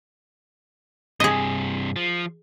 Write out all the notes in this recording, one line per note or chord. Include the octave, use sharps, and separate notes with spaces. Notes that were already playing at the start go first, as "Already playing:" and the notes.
G2 C3 G#4 D#5
F3